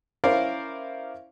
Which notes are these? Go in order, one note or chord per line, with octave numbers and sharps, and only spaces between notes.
C#4 E4 A#4 C5 D5 F5